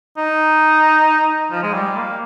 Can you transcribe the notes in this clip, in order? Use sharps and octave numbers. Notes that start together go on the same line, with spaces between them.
D#4
F3
G#3
G3
A#3